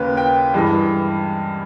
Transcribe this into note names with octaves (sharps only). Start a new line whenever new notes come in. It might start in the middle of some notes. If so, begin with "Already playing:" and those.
Already playing: D#2 C#3 A#3 B4
G5
G2 E3 G#3